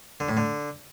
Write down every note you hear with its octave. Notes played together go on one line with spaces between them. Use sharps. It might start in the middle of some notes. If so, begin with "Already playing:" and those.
D3
A2
D3